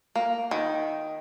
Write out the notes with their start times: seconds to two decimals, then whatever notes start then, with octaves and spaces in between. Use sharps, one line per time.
0.16 A#3
0.51 D#3